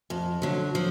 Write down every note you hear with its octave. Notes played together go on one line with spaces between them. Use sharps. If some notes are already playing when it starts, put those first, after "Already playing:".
F2
D3 F#3
F3